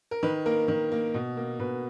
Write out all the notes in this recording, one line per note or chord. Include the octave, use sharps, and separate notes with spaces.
A#4
D#3 B4
A#3 A#4
D#3
A#3
B2
A#3
B2 B4